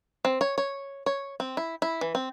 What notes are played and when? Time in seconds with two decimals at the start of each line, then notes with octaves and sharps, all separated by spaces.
0.25 C4
0.41 C#5
0.58 C#5
1.06 C#5
1.40 C4
1.57 E4
1.82 E4
2.01 E3
2.15 C4